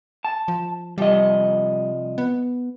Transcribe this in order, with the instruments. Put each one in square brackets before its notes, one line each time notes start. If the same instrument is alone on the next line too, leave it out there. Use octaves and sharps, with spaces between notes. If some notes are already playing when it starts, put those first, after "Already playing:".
[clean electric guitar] A5
[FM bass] F3
[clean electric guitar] C2 F3 D#5 [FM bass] G3
[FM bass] B3